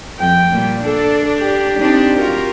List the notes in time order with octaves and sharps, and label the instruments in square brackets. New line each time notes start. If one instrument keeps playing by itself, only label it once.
[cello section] F2 F3 [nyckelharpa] G5
[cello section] A#2 G3
[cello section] D4 [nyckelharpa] A4
[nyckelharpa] G4
[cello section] C4 D4 D#4
F4 F#4 A#4